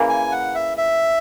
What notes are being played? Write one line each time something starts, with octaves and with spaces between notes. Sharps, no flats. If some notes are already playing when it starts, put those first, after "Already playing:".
Already playing: C#3 E3 A#3
G#5
F#5
E5
E5